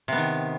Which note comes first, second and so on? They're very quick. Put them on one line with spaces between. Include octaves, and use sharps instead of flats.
C3 B3 D#3